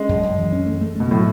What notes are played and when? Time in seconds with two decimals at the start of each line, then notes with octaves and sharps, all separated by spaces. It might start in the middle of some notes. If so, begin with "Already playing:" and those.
Already playing: G#3 C#4
0.09 F#2
0.23 F#2
0.38 E3
0.52 C#4
0.66 A3
0.81 A3
0.96 B2 A3
1.11 A2 F#3